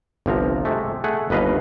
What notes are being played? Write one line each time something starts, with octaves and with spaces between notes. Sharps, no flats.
G1 C2 F3 A#5
C3 G#3 A3
A3 G#4 F#5
G1 D#2 B4 D#5 F5